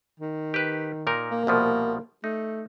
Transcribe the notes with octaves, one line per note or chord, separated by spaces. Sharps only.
D#3
G4 B4
A#2 D#4 A#4
A#3
C2 B2 F3
A3 D#4